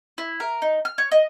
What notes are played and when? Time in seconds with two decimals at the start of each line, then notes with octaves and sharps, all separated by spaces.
0.18 E4
0.40 A#4
0.62 D#4
0.85 F6
0.98 C#5
1.12 D#5